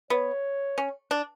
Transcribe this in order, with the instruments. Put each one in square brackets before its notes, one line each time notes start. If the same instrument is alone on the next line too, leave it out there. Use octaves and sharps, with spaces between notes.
[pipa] B3 [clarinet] C#5
[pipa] C#4
D4